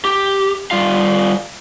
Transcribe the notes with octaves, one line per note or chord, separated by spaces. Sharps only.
G4
G3 F4 F5